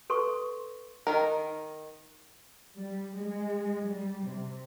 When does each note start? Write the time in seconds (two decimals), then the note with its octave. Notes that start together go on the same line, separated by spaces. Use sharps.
0.10 A4 B4 C6 C#6
1.07 D#3 A#4
2.77 G3
3.19 G#3
3.88 G3
4.29 C3